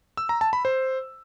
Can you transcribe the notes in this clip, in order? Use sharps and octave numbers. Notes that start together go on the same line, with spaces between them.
E6
A#5
A5
B5
C5